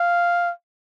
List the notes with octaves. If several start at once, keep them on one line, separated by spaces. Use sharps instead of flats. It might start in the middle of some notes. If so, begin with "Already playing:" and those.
Already playing: F5